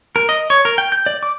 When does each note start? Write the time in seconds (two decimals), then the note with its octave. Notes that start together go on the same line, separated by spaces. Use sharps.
0.16 A#4
0.29 D#5
0.50 C#5
0.65 A#4
0.78 G5
0.92 G6
1.06 D5
1.23 D6